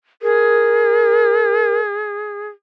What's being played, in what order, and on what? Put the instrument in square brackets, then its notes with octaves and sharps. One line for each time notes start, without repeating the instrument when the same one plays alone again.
[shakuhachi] G#4 [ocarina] A#4